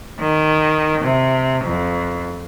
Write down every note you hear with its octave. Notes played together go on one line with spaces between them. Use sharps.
D#3
C3
F2